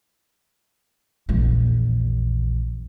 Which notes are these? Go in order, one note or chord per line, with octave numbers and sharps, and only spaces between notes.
A#1 E2